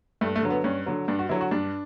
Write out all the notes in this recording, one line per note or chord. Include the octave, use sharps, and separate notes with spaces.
G2 A3
A3
D3 F#3
B3
G2 C#4
D3 F#3
G2 D4
F#4
D3 F#3 E4
F#4
G2 D4